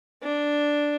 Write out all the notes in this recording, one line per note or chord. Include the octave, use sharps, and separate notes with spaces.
D4